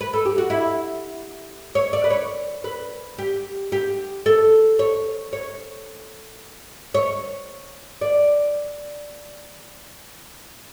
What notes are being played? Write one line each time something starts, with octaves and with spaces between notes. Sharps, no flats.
B4
A4
G4
F#4
E4
C#5
D5
B4
C#5
B4
G4
G4
A4
C#5
C#5
C#5
D5